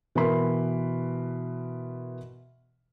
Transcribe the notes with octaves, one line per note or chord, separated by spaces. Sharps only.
B2 E3 A#4 B5 C6